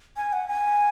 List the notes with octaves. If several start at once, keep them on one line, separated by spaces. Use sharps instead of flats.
G#5
F#5
G#5